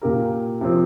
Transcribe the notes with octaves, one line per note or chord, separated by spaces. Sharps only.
A#2 A#3 G4 A#4
C3 F3 C4